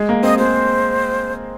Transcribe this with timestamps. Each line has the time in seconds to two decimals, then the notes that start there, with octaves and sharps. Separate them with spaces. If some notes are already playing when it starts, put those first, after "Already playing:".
Already playing: G#3
0.09 A#3
0.23 C4 D#5
0.38 G#3 C5